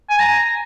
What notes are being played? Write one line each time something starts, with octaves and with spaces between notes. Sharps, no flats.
G#5
A#5